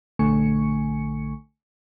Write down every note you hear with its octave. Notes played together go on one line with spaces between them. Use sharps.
A#1 D3 A3 G#5 C#6 C#7